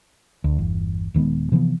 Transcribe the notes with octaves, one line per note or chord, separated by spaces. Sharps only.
D2
G1 E2
D#1 D#3 G#3 B3
C3 E3 F3 B3